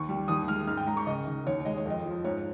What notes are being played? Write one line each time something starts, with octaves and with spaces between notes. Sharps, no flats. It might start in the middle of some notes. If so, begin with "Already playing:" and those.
Already playing: D#2 C#6
G3
D#2 D#6
G#3 F6
G#2 F6
G5
G#3 A#5
C#6
C#2 D#5
D#3
D#2 C#5
G#3 D#5
C#5
F2 D#5
F3
G#2 C#5